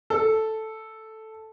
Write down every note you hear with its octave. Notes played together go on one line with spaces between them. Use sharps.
A4